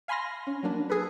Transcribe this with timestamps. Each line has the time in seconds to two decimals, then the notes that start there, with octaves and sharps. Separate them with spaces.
0.08 F5 G#5 B5 C6 F6 A#6
0.47 C#4
0.63 F#3 A#3 D4
0.90 G#4 A4 B4